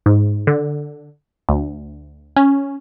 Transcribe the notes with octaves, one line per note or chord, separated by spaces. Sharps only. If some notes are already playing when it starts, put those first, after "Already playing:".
G#2
D3
D2
C#4